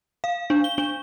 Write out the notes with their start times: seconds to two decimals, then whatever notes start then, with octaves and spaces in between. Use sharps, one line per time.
0.24 F5
0.50 D4
0.64 G7
0.78 D4